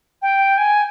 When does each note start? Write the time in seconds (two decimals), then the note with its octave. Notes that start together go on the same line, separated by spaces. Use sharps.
0.21 G5
0.57 G#5